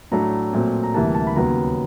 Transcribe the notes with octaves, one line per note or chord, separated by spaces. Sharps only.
A2 F#3 A3 D4 A#5
A#2 F#3 A3 C4
A#5
D2 C3 E3 G3 A#3 A5
A5
B5
D#2 C#3 F#3 B3 A#5